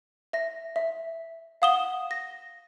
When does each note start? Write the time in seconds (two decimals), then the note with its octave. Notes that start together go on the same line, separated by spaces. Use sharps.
0.33 E5 A#6
0.76 E5
1.62 F5 F#5 D#6 E7 G7
2.11 A#6